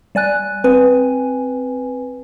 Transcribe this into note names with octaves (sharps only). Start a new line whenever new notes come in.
G3 D5 G#5 F#6
C4 B4 G#5